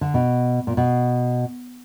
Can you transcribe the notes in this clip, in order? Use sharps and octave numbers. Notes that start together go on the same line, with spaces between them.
D3
B2
A#2
B2